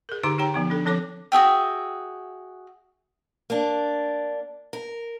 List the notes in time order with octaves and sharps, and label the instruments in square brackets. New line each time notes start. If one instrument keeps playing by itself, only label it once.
[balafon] G#4 A#4
D3 D#4 G4 A#5 D6
D#4 G4 C#5 G5 A#5
F3 B3 D#4
D4 A4
F3 C4 A4 C#5 D6
[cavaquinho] F#4 G#4 E5 G5
[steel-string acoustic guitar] A#3 D4
A#4